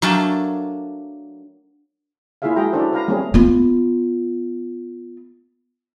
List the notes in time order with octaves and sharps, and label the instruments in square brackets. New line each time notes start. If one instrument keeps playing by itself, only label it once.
[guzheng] F#3 A3 A#3 D4 G5 A5
[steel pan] A#3 E4 F4 G#4 E5 F5
G#3 F#4 G#4 G5 A#5
C#4 D4 E4 F#4 A4 C5
B4 F5 A#5
G3 A3 A#3 C4 C#4 G#4
[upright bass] B3 F4